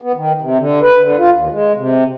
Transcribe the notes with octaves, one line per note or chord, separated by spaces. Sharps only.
B3
D#3
C3
D3
B4
D3
F4
D#2
G#3
C3